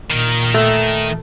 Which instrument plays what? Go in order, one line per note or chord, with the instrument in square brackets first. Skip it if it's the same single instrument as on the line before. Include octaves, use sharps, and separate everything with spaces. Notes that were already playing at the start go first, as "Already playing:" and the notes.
[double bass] A#2 [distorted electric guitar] D#3 A#4
[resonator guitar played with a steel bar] A3